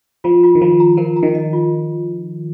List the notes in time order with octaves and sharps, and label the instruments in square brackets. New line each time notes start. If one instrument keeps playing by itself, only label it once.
[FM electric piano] F3 [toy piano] F4
[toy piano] F4
[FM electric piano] D#3
[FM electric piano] F3 [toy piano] F4
[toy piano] A#5
[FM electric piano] F3 [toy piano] A#4
[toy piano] A#5
[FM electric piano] D#3
[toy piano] D#5
F4